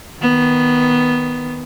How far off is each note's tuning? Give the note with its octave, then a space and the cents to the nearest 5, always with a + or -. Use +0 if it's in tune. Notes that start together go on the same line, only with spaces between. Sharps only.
D#3 +10 B3 +0